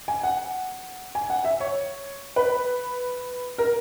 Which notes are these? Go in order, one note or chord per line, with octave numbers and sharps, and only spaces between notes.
G#5
F#5
G#5
F#5
E5
C#5
B4
A#4